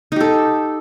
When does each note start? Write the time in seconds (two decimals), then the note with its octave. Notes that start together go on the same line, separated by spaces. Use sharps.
0.12 D#4
0.16 G4
0.21 A4